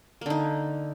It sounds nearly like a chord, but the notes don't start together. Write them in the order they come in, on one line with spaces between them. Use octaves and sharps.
A#3 D3 D#4